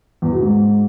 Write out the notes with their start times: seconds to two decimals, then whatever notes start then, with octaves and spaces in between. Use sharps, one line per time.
0.22 E2
0.32 B2
0.41 G#2